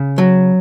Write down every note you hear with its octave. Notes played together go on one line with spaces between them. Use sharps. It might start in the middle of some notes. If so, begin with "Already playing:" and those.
Already playing: C#3
F#3